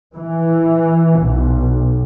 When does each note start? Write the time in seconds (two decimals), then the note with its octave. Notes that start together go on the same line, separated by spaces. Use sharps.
0.15 E3
1.20 B1